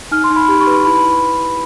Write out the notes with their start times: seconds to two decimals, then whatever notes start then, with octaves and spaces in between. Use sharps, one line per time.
0.11 D#4 F6
0.24 C6
0.30 D#4
0.36 B5
0.48 G4
0.61 C#6
0.67 B4
0.73 B5
0.85 E4 B5